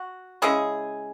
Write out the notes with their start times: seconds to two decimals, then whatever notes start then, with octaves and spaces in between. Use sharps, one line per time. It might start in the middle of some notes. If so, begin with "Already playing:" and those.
Already playing: F#4
0.42 C#3 G#3 C#4 E4 G#4